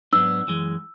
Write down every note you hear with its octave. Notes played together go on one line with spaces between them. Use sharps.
G#2 F#3 B3 D4 E6
F#2 E3 G#3